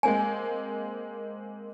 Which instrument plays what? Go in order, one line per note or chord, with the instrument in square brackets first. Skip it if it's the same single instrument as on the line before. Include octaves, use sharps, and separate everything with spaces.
[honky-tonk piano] G#3 A#3 C4 [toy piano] G#5